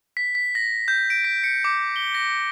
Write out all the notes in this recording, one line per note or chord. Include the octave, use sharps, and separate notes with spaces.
B6
B6
A#6
G6
D7
B6
C#7
D6
G7
A#6